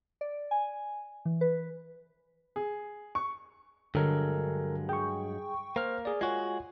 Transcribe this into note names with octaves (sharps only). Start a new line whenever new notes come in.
D5
G#5
E3
B4
G#4
C#6
G2 D3 F#3 G#3 A4 A#4
G#4 G5 C#6
A#3 C5 F6
G#4 D5
G#3 F4 F#4 C#5 G#5